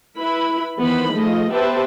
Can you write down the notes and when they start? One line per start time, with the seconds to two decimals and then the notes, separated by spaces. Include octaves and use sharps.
0.17 E4 B4 B5
0.79 D#3 E3 B3 B4 C5 B5
1.13 F3 A3 G#4 D#5
1.52 B3 G4 B4 C5 E5 A5